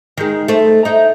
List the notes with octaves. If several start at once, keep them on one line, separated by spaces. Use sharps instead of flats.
D#3 G#3
A3 C5
D#4 E4